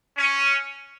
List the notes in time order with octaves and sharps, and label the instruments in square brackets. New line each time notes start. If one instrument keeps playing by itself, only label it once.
[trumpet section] C#4